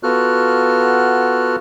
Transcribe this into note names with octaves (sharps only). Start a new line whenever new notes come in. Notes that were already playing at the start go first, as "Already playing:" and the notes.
B3 F4 F#4 A4 F6 F#6